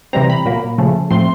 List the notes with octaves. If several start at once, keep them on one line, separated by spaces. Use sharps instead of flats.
C3 E3 G3 C4 A#5
B5
A#2 F#3 A#3
C#3 F3 A3
A2 F3 A3 C4 C6